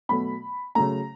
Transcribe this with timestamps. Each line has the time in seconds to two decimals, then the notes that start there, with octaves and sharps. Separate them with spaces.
0.09 B2 F#3 A3 B5
0.75 C#3 F#3 A3 A#5